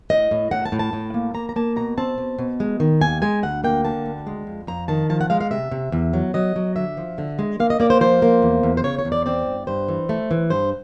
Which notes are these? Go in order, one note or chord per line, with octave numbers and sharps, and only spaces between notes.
A2 D#5
A2
A2 F#5
A5
A2
A5
A2
A#3
A#3 A#5
A#5
A#3 A5
B2 A#5
C4 A5
B2
B2
G#3
D#3
D#2 G#5
G#3 G#5
D2 F#5
A#3 G5
D3 A5
D2
G#3
F2
F2 A#5
D#3 A5
F3 A5
F#5
G#3 F5
F5
C3 E5
C3
E2
F#3
F#3 D#5
F#3
D3 E5
F3
D3
G#3
A#3 F5
D#5
A#3 D5
C5
F3 C5
A#3
E2
E2
C5
C#3 C#5
C#5
E2
D5
C4 D5
G2
G2 C5
E3
A3
E3
G2 C5